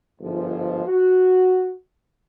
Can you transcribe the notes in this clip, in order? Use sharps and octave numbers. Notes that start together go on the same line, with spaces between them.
G1 G#2 F3
F#4